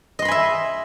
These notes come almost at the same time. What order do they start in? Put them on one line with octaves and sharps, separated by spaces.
D#5 C6 B5 G#5 E5